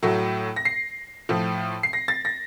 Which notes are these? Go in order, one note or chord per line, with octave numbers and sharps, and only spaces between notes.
A2 F#3 A3
A#6
C7
A2 F3 A3
C7
A#6
A6
A#6